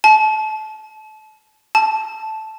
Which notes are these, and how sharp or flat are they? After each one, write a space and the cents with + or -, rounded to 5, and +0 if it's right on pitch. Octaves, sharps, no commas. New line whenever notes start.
A5 -25
A5 -5